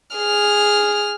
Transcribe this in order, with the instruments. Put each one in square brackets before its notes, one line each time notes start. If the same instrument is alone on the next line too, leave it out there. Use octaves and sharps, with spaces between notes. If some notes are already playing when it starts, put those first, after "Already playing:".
[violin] G#4 F6